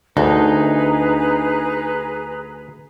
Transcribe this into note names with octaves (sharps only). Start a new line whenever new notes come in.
D2 D4 D#4 G#4 B4 A#5